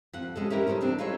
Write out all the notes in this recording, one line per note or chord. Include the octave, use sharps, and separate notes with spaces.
F2 F#5
G3 G#3 C#4 A4
C#4 E4 G4 A#4 B4 D#5
D#3 G3 A4 C5 C#5
E2 C4 D4
D#4 F4 G#4 A4 B4 C#5